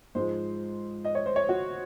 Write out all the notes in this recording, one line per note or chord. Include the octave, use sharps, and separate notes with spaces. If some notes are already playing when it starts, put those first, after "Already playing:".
G#2 F3 G#3 C5
D#5
C#5
C5
C#5
F#4